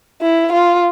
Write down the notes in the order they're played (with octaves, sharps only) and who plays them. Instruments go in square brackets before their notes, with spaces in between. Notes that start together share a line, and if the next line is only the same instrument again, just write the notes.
[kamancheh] E4
F4